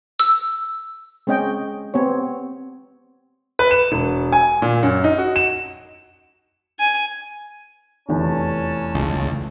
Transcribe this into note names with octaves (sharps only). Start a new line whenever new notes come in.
E6
G#3 C4 C#4 D#5 G5
B3 C4 G4 C#5
B4
E7
E1
G#5
A#2
F#2
D#4
F#4
E7
G#5
F1 E2 C#4 A5
C#2